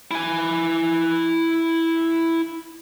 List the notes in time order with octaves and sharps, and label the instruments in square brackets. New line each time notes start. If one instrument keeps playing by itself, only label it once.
[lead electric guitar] E4 G#5